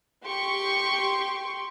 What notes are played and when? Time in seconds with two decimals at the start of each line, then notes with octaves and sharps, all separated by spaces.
0.24 G4 C6 C#6